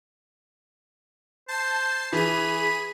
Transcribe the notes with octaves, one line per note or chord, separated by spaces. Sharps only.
C5 A5 C7
E3 G#4 B5 D#7